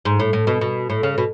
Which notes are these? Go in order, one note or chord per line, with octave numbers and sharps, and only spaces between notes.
G#2
A2
A2
B2
B2
A2
C#3
B2